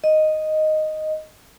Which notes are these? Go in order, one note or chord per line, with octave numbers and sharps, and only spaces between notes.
D#5